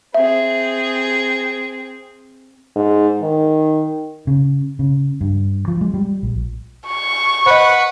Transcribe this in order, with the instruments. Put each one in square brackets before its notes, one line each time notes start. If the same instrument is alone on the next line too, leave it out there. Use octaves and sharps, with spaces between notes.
[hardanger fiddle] C4 G#4 [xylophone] E5
[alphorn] G#2
D#3
[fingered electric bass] C#3
C#3
G2
F3
G#3
G3
A#1
[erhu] C#6
[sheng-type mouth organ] B4 F#5 B5 [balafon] C5 D#5